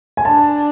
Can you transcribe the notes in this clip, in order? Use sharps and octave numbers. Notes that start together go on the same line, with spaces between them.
G#5
D4 A5